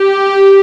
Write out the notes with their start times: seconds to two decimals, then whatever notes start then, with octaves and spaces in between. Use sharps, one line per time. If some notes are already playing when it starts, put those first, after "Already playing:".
Already playing: G4